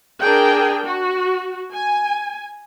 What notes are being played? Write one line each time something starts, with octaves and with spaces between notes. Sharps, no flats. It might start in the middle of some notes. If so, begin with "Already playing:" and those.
D4 G#4 A#4 G5
F#4
G#5